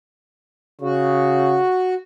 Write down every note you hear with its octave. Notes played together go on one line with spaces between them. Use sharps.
C#3 F#4